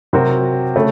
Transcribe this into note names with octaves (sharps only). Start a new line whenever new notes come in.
C3 F#3 C4 F#4 A#4
C#3 A3